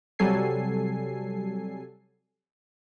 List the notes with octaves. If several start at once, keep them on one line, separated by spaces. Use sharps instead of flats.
C3 F#3 G3 A4 G#5 C7